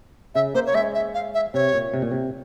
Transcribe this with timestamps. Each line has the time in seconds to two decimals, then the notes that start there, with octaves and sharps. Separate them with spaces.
0.35 C#3 E5
0.55 A#3 C5
0.66 C#5
0.75 G#3 E5
0.94 E5
1.14 F5
1.34 E5
1.54 C3 C#5
1.74 A#2
1.94 C3
2.02 A#2
2.12 C3